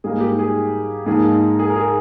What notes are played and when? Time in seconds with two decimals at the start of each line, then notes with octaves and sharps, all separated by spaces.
0.04 G#2 G3 A#3 D#4 G#4
0.20 G4
0.39 G#4
1.06 G#2 F3 A#3 D#4 G#4
1.59 G#4
1.70 A#4
1.76 G#4